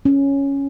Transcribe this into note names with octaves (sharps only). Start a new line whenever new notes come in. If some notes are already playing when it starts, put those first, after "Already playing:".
C#4